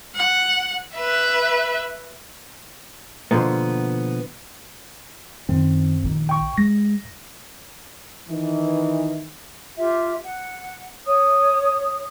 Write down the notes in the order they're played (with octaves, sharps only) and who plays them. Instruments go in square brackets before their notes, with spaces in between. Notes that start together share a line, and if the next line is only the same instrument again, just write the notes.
[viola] F#5
[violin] B4 E5
[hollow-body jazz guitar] B2 D3 F3 A#3 B3
[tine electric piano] F#2 C4 [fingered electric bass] D#3
[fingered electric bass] A#1 D#3
[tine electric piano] G5 C#6
[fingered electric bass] G#3 [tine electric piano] A#6
[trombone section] D#3 E3
[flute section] F4 G4 E5
F#5
C#5 D#6